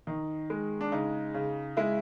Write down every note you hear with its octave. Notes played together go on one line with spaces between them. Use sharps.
D#3 D#4
G#3
D4
C#3 D#4
C#3
G#3 E4